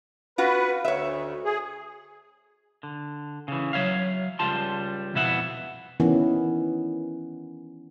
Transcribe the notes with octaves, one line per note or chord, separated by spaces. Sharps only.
F4 F#4 B4
D2 C#5 E5
G#4
D3
C#3 E3
F#3 G#3 C#5 E5 F5
C#2 G3 F4 A5 C6
F2 B2 B3 E4 E5 F#5
D#3 E3 B3 C#4 E4